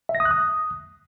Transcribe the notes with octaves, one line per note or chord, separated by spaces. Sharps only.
E5
A#6
D#6
F#6
D#6